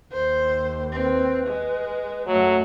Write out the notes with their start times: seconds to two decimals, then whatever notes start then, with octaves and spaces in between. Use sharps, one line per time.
0.12 D#2 C5
0.93 C4 B4
1.48 G#3
2.27 F#2 F#3 A3 F#5